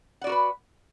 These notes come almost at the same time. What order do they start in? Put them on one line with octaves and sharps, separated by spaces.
F#5 D5 F#4 A#4 B4